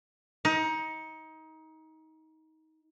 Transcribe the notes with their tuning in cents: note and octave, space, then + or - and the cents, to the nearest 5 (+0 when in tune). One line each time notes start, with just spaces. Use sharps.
D#4 +25